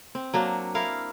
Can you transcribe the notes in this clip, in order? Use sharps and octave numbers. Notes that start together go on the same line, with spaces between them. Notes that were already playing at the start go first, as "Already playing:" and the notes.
C4
F#3 A#3 D4
E4 A#4 F5